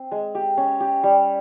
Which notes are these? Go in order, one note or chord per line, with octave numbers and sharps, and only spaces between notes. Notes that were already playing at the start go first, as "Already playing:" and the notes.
Already playing: C4
G#3
G4
C#4
G4
G3